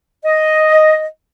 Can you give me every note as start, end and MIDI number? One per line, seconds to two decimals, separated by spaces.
0.25 1.06 75